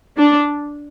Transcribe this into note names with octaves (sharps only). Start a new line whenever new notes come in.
D4